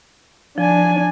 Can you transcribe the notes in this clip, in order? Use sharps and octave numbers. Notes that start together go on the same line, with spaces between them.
F3 D4 G#5